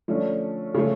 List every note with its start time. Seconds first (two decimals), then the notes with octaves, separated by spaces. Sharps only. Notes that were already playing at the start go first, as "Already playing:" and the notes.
0.08 D3 F3 A3 C#4
0.74 C#3 F3 A3